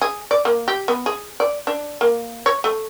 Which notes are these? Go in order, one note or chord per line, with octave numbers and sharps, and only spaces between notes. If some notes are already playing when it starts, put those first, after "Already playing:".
G#4
D5
A#3
G4
B3
G#4
D5
D4
A#3
C#5
A3